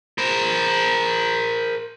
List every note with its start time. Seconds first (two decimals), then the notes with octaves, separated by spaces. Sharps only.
0.18 A#4 C5